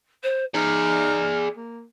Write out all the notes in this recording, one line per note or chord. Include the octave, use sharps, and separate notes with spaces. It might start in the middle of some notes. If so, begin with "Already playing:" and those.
C5
D#4 G#4 D5 F6
A#3